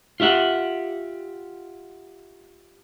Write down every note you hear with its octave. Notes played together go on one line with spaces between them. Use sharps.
F4 G4 E5 F#5